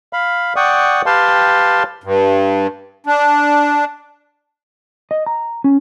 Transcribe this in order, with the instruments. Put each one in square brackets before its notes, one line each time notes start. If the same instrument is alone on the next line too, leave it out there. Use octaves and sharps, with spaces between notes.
[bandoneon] F5 B5
D5 F#5 G5 C#6 D#6
G4 B4 F5 G5 A5 C6
[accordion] G2
D4
[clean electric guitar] D#5
A#5
C#4